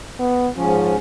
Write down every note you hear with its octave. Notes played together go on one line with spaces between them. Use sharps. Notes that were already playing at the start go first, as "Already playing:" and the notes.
B3
G#2 F3 C#4